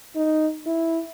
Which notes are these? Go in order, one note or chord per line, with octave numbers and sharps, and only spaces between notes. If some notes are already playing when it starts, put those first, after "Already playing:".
D#4
E4